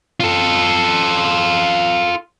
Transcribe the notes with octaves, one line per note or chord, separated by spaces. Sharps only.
F4 A4